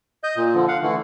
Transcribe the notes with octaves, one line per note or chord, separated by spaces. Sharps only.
D#5 G6
A#2
D3 F3
F5 F#5
D3 E3 A3